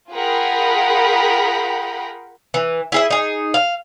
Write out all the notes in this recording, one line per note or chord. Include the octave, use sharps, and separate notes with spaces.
F4 G#4 A#4 F#5 G5 B5
E3
E4 G#4 E5
D#4 G#4
F5